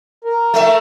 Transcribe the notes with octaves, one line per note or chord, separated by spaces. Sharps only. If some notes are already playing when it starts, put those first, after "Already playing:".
A#4
A3 E5